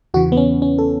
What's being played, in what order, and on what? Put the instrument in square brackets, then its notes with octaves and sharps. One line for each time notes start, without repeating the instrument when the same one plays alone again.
[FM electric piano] E2 C#3 E3 F#4
B3
C#4
C#4
A4